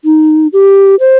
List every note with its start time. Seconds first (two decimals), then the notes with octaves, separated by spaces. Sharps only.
0.05 D#4
0.53 G4
1.00 C5